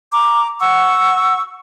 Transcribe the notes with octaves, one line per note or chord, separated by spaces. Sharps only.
A#5 D6
F#5 C#6 E6